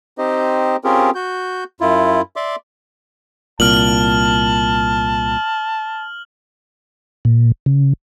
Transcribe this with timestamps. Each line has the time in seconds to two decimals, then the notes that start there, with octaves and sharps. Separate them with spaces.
0.18 C4 D#4 G4 C5 D#5
0.84 C4 C#4 F4 G4 G#4 A#4
1.15 F#4 G6
1.81 F#2 E4 F4
2.36 D5 E5 C6 D6
3.60 C2 A#2 A5 F6 F#7
7.25 A#2
7.66 C#3